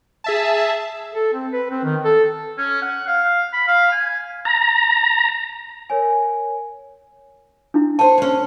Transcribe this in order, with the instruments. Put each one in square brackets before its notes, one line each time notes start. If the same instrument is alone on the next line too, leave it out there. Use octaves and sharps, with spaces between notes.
[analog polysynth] G#4 E5 A5
[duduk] A4
C4
B4
C4
D#3
A4
[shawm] C#4
F#5
F5
B5
F5
G#5
[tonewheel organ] A#5
[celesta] A#4 C#5 G#5
[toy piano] D4 E4
[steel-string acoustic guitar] C5 C#5 [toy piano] A5
[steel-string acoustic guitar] G#3 C#4